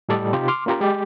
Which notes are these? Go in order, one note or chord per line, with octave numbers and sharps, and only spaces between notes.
A2 G3 A4 D5 D#5
C3 D#4 F4 G4 F5
C6 D6 F6
A#3 C#4 F4 G4 A#4
G#3 G4